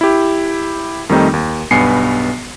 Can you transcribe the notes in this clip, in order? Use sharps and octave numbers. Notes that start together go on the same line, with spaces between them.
E4 G4
F2 D#3 G3 A3 C4 D#4
D#2
B1 G2 B3 G#5 C7 C#7